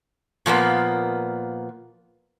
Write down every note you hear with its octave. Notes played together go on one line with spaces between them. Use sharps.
A#2 F3 A#3 B3